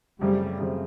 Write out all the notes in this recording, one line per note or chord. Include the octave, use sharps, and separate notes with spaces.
F#2 C#3 F3 G3 A3 C4
F#2 C#3 F3 A3 C4